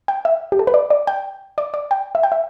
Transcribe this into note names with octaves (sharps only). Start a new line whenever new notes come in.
G5
E5
G4
A4
B4
D5
D5
G5
D5
D5
G5
E5
G5
E5